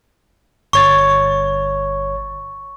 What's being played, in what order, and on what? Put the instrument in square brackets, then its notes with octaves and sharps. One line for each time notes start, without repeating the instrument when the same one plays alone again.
[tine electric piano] G1 C#5 A6 [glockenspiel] C#6